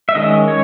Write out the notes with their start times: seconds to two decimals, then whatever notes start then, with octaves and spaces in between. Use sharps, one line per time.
0.09 E5
0.15 D#3 G#3 C#4 D#5
0.48 C#5